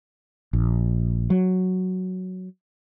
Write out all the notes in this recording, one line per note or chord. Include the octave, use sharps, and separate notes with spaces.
A#1
F#3